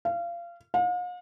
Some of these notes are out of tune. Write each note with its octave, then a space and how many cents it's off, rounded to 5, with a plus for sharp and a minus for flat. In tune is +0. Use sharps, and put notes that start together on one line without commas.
F5 -25
F5 +45